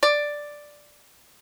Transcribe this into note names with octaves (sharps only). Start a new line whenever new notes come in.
D5